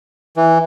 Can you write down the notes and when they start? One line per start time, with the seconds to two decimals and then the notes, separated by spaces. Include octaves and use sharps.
0.37 E3